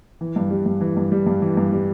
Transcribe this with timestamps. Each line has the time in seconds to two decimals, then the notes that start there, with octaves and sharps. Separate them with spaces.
0.21 E3
0.36 G2
0.51 G3
0.66 G2
0.81 E3
0.97 G2
1.12 G3
1.27 G2
1.42 E3
1.57 G2
1.73 G3